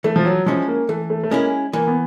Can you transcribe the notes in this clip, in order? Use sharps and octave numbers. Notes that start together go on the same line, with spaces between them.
E3 A3
F3
F#3
F3 G#3 C#4 E4
A#3
E3 A3
A3
A3
G#3 A#3 C#4 E4
E3 A#3
B3